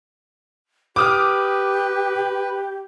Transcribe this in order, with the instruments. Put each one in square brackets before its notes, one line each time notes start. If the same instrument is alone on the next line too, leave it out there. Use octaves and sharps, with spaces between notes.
[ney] G4 [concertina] B4 [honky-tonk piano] D6 D#6 F6